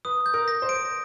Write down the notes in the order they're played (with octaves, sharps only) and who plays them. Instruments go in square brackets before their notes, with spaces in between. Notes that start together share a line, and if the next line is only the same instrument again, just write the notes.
[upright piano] B4 [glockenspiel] D#6
[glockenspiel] G6
[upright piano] A#4
[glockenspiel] A#6
[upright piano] C5
[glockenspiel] D7